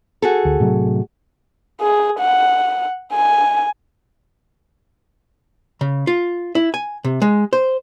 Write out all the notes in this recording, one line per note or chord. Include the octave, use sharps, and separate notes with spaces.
F#4 G#4 A4
D2
A2 C3 F#3
G#4
F#5
G#5
C#3
F4
E4
G#5
C3
G#3
C5